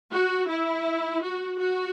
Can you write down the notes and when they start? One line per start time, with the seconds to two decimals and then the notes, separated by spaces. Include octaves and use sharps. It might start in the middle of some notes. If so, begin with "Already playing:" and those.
0.12 F#4
0.49 E4
1.23 F#4
1.58 F#4